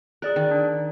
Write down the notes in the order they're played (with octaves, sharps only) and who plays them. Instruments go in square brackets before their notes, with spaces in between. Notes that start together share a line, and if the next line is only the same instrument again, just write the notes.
[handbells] G#4 D5 F#6 [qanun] A#4
[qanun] D#3
[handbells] D4